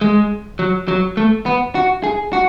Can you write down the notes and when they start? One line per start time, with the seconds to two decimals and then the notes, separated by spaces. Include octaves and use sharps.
0.01 G#3
0.59 F#3
0.88 F#3
1.17 A3
1.46 B3
1.75 F#4
2.04 G#4
2.33 F#4